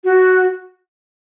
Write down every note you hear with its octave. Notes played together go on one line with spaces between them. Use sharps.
F#4